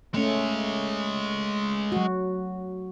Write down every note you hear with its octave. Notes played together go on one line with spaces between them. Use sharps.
G#3 A3 C#4 C#5
F#3 F#4